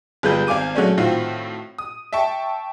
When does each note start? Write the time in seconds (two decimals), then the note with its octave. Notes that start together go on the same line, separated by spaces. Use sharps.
0.23 G1 G3 G#3 F4 B4 G6
0.47 G#1 F5 G#5 D6 D#7
0.75 F#3 G#3 A3 C#4 D4
0.98 A2 D#3 C4 F4 F#4
1.78 D#6
2.13 E5 G5 A5 C#6